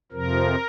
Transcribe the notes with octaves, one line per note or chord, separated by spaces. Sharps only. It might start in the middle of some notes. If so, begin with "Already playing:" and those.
F2 C3 F3 A#4